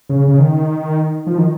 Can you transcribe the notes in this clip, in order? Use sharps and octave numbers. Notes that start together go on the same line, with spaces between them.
C#3
C#3
D#3
F3
D#3